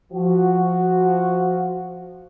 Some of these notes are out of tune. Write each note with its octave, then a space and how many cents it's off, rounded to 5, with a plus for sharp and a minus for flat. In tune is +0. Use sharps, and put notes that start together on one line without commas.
F3 +0 F#4 +0